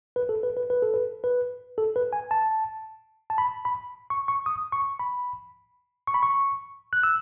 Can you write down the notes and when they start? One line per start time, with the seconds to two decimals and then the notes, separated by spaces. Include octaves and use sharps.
0.16 B4
0.29 A4
0.43 B4
0.57 B4
0.70 B4
0.82 A4
0.94 B4
1.24 B4
1.78 A4
1.96 B4
2.13 G#5
2.31 A5
3.30 A5
3.38 B5
3.65 B5
4.10 C#6
4.28 C#6
4.46 D#6
4.72 C#6
4.99 B5
6.07 C#6
6.14 B5
6.23 C#6
6.93 F#6
7.03 E6